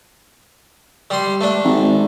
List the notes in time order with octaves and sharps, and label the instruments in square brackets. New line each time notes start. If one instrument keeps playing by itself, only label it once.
[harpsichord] G3 C6
A3 D4
[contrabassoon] G#1